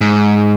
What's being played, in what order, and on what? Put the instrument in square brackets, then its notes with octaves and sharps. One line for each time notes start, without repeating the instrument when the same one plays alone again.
[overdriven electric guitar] G#2